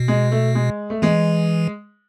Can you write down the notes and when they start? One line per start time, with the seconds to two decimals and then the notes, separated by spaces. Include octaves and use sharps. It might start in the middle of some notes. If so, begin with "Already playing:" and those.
Already playing: B2
0.08 G#3
0.32 A3
0.55 G#3
0.90 A3
1.02 E3 G#3